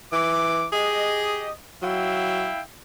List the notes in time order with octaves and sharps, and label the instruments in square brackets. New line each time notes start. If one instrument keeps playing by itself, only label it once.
[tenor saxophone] E3 [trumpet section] D6
[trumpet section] G4 D#5 [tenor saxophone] G#4
[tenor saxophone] F#3 [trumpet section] E4 F5 G5